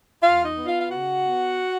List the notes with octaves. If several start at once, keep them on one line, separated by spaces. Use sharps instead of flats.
E2 F4 F5
D#4 D#5
B3
F4 F5
F5
C#3 F#4 F#5
B3